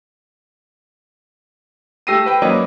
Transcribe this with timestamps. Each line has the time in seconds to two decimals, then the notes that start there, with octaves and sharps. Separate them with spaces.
2.07 A3 G4 E6 A#6 C7 D#7
2.26 B4 G5
2.42 F#3 A#3 C#4 B4 D5 D#5